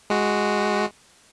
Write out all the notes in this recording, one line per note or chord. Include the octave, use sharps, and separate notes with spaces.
G#3 F#4